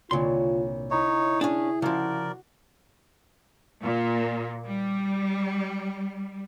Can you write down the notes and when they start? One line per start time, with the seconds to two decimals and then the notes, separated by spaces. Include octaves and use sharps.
0.11 C2 A#2 D3 F4 C#5 C6
0.91 D#4 E4 C#5 E5 A#5 B5
1.41 C#4 D4 G#4
1.82 C#3 F3 F#4 A#4 D5
3.83 A#2
4.66 G3